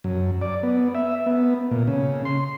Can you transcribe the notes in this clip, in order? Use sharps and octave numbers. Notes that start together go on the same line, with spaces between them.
F#2
D5
B3
E5
B3
A#2
C#3
C6